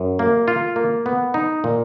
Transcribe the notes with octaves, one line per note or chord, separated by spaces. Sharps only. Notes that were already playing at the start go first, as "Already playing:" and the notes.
Already playing: F#2
A#3
F4
A#3
B3
D#4
A#2